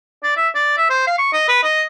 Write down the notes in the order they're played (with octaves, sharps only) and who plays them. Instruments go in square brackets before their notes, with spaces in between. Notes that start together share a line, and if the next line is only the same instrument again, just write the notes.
[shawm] D5
E5
D5
E5
C5
F5
C#6
D#5
B4
D#5